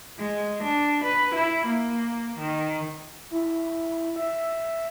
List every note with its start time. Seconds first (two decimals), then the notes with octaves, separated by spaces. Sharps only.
0.19 G#3
0.63 D4
1.04 B4
1.35 E4
1.67 A#3
2.39 D#3
3.31 E4
4.16 E5